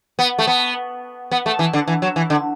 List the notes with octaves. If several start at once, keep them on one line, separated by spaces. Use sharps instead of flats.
B3
A3
B3
B3
A3
E3
D3
E3
F#3
E3
D3